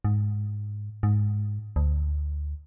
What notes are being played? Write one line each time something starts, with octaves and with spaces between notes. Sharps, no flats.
G#2
G#2
D2